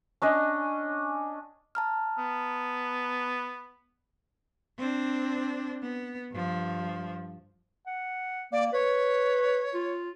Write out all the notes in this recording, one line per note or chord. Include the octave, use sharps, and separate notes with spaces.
C#4 D4 D#5
A5 A#5 F6
B3
C4 D4
B3
G2 F3
F#5
A#3 D5
B4 C#5
F4